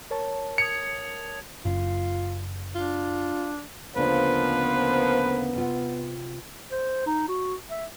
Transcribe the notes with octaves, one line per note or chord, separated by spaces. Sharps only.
A#4 C#5 A5
D#6 G#6 C#7 F7
F#1 F4
D4 F4
D2 C#3 F3 A#3 B3 D4 B4 C5
C3 F4 F#5
C5
D#4
F#4
E5